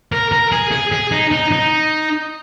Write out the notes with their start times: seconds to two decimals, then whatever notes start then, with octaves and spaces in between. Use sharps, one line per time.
0.12 A#4
0.32 A#4
0.52 G#4
0.72 G#4
0.92 G#4
1.11 D#4
1.32 D#4
1.51 D#4